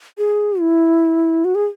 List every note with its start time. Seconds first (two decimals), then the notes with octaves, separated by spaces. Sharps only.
0.18 G#4
0.60 E4
1.45 F#4
1.55 G#4